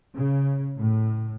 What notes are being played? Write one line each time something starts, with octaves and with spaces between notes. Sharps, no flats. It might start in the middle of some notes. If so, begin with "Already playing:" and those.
C#3
A2